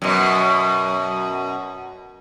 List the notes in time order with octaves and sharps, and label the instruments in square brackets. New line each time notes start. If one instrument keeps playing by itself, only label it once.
[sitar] F#2 B2